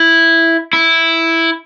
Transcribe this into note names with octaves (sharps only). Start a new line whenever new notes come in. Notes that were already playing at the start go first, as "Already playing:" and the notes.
Already playing: E4
E4